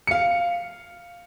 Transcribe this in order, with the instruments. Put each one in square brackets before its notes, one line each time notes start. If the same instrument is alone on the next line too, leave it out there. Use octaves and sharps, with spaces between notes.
[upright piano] F5 C#7